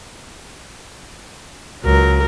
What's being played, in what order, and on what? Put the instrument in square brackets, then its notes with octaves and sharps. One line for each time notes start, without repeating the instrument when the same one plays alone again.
[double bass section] C#2 [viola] F#3 A#4